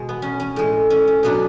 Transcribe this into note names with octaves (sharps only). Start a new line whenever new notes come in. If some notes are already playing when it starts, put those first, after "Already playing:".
Already playing: B2 G#3
B3
C#4
C#4
A2 G#3
C#4
C#4
B2 F#3 B3 D4